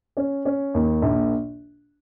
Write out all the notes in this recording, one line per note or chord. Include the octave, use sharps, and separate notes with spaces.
C#4
C#4
D#2
A#1